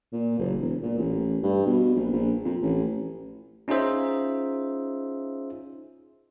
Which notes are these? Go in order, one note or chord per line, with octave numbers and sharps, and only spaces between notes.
A#2
F#1
E1
A#2
A1
G2
B2
A#1
A#1
F2
A1
C#4 D#4 F4 G#4 C5 E5